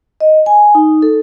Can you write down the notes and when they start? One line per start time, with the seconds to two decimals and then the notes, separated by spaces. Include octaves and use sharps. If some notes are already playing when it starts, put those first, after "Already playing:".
0.20 D#5
0.46 G#5
0.75 D#4
1.02 A4